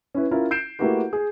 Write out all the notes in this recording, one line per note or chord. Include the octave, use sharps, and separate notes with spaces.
C#4 E4 B4
C#4 E4 F4 A#4
G6 C7 D7 E7
A3 A#3 E4 F#4 G4 B4
G#4